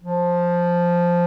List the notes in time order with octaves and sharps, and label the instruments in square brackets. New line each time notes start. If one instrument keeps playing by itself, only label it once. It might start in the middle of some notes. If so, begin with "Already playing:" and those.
[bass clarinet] F3